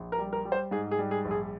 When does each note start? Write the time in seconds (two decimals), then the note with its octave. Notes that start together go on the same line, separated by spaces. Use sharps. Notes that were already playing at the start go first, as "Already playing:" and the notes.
Already playing: A#1
0.12 A#4
0.18 G3
0.33 A#4
0.45 G3
0.52 C5
0.71 G#2 G#4
0.91 G#4
0.99 G3
1.11 G#4
1.25 A#1
1.31 G#4